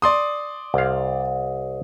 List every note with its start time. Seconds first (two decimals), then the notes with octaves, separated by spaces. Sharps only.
0.02 D5 C6 D#6
0.74 C2 F5